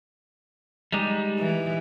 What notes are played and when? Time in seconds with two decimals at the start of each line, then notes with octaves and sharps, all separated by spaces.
0.92 G3 G#3 D#4 G4
1.39 E3